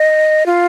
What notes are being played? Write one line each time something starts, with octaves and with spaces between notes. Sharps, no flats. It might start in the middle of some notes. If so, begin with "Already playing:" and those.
Already playing: D#5
F4